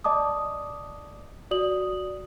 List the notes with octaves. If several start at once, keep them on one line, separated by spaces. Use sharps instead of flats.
D5 D#5 A5 D6 D#6
F#4 D5 D#6 F#7